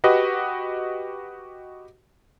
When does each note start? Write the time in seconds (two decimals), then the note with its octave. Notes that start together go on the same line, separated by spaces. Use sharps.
0.04 F#4 G4 B4 D#5